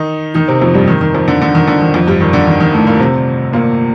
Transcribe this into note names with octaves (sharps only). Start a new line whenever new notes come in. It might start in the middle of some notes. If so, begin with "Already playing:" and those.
Already playing: D#3 D#4
D#3 D#4
C3 C4
F2 F3
G2 G3
D#3
D#3
F2 F3
D3
D3
D#3
D3
D#3
F2 F3
G2 G3
D#3
D3
D#3
D#3
A2 A3
A#2 A#3
C3 C4
A#2 A#3